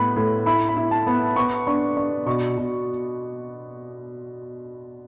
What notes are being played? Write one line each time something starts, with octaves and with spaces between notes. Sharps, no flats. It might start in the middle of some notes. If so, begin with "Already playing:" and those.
Already playing: A2 B3 B5
A2
E4 B5
B5
E4
A5
B3
B3 C#6
D4 C#6
D4 C#6
B2 C#6
B2